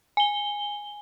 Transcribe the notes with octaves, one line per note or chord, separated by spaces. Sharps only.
G#5 G7